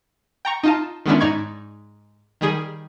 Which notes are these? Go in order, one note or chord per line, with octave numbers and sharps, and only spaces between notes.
G5 A#5 C#6
D#4 F4 A5
D#3 G#3 B3 C#4 D4 E4
G#2 D#4 D5 C#6 G#6
D#3 G3 G#4